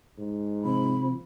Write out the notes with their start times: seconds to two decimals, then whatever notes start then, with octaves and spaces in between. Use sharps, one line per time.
0.18 G#2
0.64 C3 F3 C4 B5